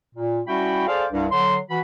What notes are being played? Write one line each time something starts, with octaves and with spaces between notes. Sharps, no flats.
A#2
G3 C#4 E4 F#4 G5 B5
G#4 A4 C5 D5 F5
C2 G2
D3 F#3 C6
E3 F#4 B5